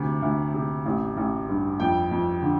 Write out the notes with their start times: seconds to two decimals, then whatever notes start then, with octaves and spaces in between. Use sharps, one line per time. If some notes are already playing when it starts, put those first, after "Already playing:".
Already playing: D2 C3
0.22 D2
0.54 C3
0.86 A1
1.17 A1
1.48 G2
1.80 F2 G5
2.11 F2
2.42 D3